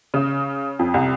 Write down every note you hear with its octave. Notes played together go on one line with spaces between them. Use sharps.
C#3
F2
C2